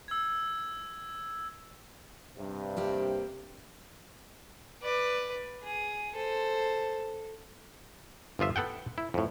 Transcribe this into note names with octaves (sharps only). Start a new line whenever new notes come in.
E6 G#6
G2 C3
A#3 C4 G4
B4 D5
G#4
A4 C5
G1 F3 F4 E5
B3 A4 F#5 G5
E4
F2 A2